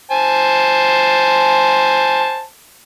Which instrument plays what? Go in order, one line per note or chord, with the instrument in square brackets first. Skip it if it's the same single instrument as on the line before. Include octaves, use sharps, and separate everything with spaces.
[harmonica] C5 G#5 A5